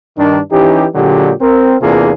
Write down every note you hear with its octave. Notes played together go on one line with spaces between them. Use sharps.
G2 D#3 D4
E3 C#4 D#4 G4
A#2 D3 F#3 G#3 G4
C4 A#4
E2 C3 A#3 D4 F4 G#4